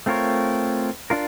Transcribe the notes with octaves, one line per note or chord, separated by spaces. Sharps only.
A3 C4 F4 A#4 C#5
D4 F4 A#4